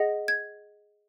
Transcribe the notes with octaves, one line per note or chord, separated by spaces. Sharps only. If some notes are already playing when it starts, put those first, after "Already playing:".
Already playing: G#4 D#5 F#5 A#6
G#6